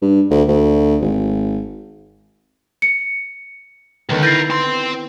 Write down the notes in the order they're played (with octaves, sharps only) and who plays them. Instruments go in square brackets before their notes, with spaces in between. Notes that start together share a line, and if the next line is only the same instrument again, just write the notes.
[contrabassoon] G2
D2
D2
G#1
[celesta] C#7
[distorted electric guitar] C#2 [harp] D3 D#3 B3
[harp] E4 [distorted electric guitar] A#4 B4 [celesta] G6 A6 C7
[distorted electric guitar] C4 C6